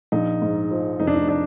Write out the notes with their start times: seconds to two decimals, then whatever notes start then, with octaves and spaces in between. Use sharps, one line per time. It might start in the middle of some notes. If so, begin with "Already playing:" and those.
0.12 A#1 D#4
0.42 G#2
0.71 F3
1.00 F1 D#4
1.07 D4
1.15 D#4
1.29 D4